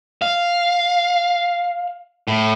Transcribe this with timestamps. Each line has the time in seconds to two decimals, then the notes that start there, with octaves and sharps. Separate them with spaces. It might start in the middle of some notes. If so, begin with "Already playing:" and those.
0.22 F5
2.28 A2